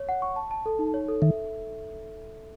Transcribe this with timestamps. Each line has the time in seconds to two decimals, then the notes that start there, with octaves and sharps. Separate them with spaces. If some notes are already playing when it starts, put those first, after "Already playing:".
Already playing: C#5
0.09 F#5
0.22 C#6
0.36 A5
0.51 A5
0.66 A4
0.79 D#4
0.94 C#5
1.08 A4
1.22 D#3 E5